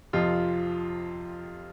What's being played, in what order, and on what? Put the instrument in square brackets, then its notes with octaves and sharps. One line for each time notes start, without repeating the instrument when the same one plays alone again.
[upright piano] F2 C3 F3 [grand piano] F4